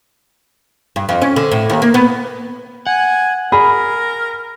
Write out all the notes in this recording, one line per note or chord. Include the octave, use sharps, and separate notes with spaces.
G2
F2
C#4
D3
A2
D#2
A#3
B3
F#5 G#5
G#4 A#4 B5